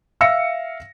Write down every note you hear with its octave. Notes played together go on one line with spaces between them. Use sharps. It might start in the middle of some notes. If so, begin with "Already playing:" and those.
E5 F5 E6 A#6 C#7